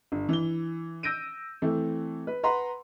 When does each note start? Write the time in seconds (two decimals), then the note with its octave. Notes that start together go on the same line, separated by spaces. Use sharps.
0.12 G1
0.29 E3 G7
1.03 E6 G6 A#6 D7 D#7
1.62 E3 A3 C4
2.27 B4
2.44 B4 F#5 A#5 C6